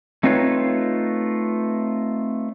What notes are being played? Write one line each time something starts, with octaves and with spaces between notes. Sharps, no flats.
A3 C4 D#4 F4 B4 C#5